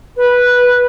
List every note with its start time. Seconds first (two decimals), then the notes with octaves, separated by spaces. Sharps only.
0.16 B4